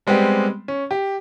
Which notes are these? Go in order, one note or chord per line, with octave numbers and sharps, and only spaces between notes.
G3 G#3 B3 C4 G4
C#4
G4